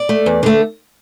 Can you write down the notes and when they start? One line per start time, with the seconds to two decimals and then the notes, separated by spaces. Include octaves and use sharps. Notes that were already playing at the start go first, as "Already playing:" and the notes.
Already playing: D5
0.09 A3
0.26 E2
0.43 D3 A3